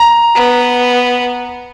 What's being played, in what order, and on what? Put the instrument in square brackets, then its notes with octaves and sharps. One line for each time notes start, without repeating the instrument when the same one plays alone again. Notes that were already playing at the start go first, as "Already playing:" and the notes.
Already playing: [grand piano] A#5
[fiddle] B3